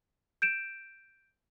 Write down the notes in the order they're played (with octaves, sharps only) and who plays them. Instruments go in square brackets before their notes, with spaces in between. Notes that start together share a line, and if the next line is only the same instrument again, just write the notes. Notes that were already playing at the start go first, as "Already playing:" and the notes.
[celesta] G6 D7 E7